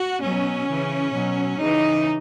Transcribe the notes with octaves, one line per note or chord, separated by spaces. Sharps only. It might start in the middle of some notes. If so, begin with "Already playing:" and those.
Already playing: F#4
B2 F#3 C#4
C#3 E3
B2 F#3
C#3 E3 D#4